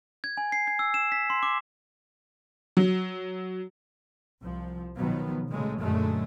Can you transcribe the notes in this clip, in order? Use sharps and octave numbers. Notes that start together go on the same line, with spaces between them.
G#6
G#5
C7
G#6
E6
E7
B6
C6
D6
F#3
C2 F3
B2 D#3 F3 F#3 B3
A#2 C#3 G#3 A3
F#2 A#2 D3 F#3 G#3 A3